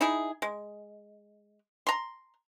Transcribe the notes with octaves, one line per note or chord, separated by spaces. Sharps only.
D#4 E4 G#4
G#3
A#5 C6